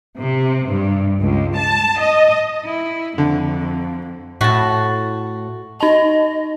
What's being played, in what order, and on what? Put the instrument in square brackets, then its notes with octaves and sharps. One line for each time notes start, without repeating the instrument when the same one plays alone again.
[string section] C3
G2
C#2
A5
D#5
[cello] E4
[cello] F2 [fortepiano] D3
[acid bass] A2 [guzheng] F#4 A5
[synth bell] D#4 A5 [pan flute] D#5